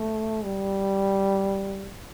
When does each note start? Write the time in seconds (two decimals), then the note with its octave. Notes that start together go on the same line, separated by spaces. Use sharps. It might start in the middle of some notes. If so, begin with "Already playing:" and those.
Already playing: A3
0.44 G3